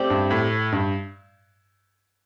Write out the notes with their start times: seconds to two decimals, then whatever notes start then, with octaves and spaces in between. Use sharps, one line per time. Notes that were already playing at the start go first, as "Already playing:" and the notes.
Already playing: A3 C4 G4 D5
0.10 G2
0.30 A2
0.72 G2